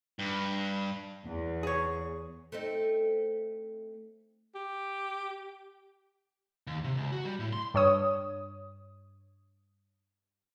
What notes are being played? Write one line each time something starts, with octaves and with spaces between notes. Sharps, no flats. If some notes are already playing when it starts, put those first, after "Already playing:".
G2
E2
G#4 C#5
A3 C4 D#4
G4
D#2
C3
C#2
F#4
G3
A2
C6
G2 C#5 D#6